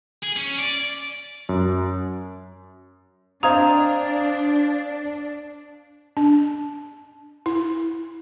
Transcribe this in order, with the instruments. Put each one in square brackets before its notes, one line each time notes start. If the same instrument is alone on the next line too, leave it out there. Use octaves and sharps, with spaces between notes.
[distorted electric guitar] G#4
C#4
D5
[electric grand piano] F#2
[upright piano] C4 C5 D#5 [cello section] D4 [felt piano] F5 D#6 G#6 [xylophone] A#5
[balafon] D4
E4